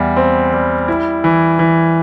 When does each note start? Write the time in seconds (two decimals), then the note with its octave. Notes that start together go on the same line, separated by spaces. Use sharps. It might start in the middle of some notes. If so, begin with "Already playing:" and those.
Already playing: E2 G3
0.17 C4
0.53 G3
0.88 E4
1.24 E3
1.59 E3